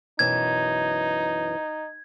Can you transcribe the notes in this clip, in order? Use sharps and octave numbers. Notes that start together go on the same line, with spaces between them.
F#2 B2 E3 D#4 G#6